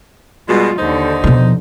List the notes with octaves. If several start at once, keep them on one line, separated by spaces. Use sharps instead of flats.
B2 G3 G#3 F4
D#2 D3 D#4 C5
B2 F3